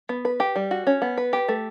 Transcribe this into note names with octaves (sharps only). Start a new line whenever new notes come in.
B3
B4
G4
G3
F#4
C#4
B3
B4
G4
A3